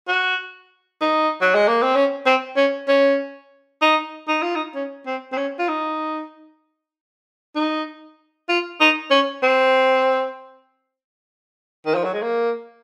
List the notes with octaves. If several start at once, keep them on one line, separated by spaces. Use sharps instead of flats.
F#4
D#4
F#3
G#3
A#3
C4
C#4
C4
C#4
C#4
D#4
D#4
F4
D#4
C#4
C4
C4
C#4
F4
D#4
D#4
F4
D#4
C#4
C4
D#3
F3
F#3
G#3
A#3